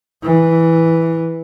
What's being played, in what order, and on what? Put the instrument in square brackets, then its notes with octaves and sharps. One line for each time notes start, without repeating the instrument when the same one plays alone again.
[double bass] E3